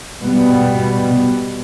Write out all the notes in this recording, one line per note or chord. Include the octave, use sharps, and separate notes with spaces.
B2 G3 B3